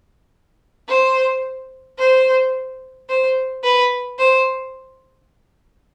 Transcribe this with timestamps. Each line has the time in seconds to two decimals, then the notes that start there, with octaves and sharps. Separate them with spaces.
0.89 C5
1.99 C5
3.09 C5
3.64 B4
4.19 C5